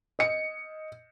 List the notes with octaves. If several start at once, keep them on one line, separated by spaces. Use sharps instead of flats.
D#5 C#7